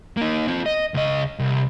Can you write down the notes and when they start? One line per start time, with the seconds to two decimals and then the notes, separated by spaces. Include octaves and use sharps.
0.17 A#3 D#4
0.48 C4 F4
0.66 D#5
0.94 C#2 D#5
1.39 C2